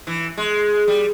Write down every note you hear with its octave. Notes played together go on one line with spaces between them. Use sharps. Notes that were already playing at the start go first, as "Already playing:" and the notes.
E3
G#3
G3